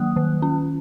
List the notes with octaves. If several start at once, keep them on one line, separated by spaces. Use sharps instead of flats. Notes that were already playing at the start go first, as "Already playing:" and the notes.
Already playing: D#3 F#3 A#3 D#6 F#6
D#3
C#4